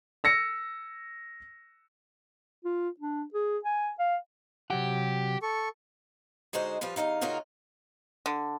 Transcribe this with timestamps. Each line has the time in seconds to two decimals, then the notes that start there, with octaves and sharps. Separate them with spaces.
0.24 E6 A#6 C#7
2.65 F4
3.00 D4
3.34 G#4
3.65 G#5
3.99 F5
4.70 C3 F#3 G4 F#5
5.42 A4 C#6
6.53 D3 G#3 D#4 F#4 C5
6.81 F3 G3 F4 B4
6.96 E2 A#2 D#4 F5
7.21 C#3 A#3 D#4 F4 F#4 A#4
8.26 D3